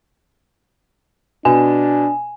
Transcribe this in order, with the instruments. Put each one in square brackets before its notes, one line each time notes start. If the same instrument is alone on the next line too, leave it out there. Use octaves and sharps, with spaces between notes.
[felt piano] B2 [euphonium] D4 [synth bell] G#5